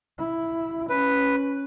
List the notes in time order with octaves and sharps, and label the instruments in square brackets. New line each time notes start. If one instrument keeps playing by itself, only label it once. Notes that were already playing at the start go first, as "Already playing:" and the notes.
[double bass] E4
[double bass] C#4 [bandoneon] B4